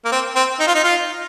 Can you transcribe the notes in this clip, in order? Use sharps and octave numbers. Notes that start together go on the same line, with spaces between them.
A#3
C4
C4
D#4
F4
D#4
F4